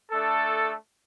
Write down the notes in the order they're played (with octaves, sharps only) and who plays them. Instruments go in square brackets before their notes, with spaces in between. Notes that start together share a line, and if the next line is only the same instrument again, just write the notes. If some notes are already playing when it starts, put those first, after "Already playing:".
[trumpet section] A3 D4 A4